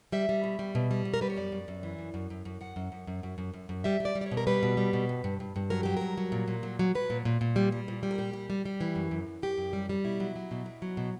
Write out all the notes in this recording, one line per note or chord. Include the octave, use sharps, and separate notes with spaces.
G3 E5
G3
B2
G3
B2
G3
B2
A#4
G3 B4
C#5
F#2 D5
F#2
F#2
E3
F#2
F#2
F#2
F#2
F#2 F#5
F#2
F#2
F#2
F#2
F#2
F#2
F#2
G3 E5
G3
D5
G3
D5
C#5
B2
A#4
G3 B4
B2
G3
B2
G2
G2
G2
G2
F#3 A#4
F#3 G4
G2 A#4
F#3
A#2
A#2
F#3
F#3
F#3 B4
A#2
A#2
A#2
G3
G3
A#2
G3
A#4
A#2 G4
G3
G3
G3
E3
F#2
F#2
F#2
F#2 G4
F#2
G3
G3
B2 E4
F#3
F#3
B2
B2
F#3
B2